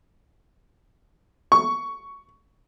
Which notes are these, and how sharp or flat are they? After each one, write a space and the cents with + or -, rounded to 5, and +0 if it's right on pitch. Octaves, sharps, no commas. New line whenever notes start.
C#6 +10